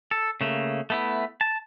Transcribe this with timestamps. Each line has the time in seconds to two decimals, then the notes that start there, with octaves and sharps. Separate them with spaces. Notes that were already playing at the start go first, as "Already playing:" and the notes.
0.11 A4
0.41 C#3 A3 A#3
0.90 A3 B3 E4
1.41 A5